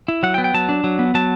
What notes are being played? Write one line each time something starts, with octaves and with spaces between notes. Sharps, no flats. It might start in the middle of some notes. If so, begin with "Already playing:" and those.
E4
F#3 F#5
G5
B3
G5
F#3 A5
D4
F#3
B3
F#3 A5